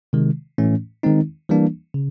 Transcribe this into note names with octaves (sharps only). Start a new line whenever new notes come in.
C3 D#3 G#3
A2 E3 A3 C#4
D#3 G#3 C4 D#4
E3 G3 A#3 D4
C#3